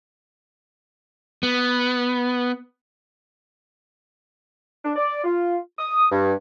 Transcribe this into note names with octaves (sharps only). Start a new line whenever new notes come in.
B3
D4
D5
F4
D#6
G2